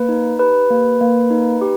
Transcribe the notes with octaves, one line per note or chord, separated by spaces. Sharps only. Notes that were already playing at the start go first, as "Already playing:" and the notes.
Already playing: A#3 B4
D#4
G4 B4
A#3
A#3
D#4
G4